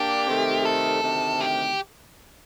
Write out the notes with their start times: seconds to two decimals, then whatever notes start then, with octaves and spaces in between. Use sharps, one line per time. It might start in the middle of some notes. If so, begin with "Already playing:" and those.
Already playing: A#3 D4 G4
0.28 C3 D#3 A3
0.65 A4
1.03 D2 C3 D#3 A3
1.41 G4